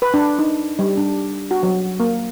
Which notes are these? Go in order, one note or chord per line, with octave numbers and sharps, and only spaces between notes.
B4
D4
D#4
G3
D4
F#4
F#3
A#3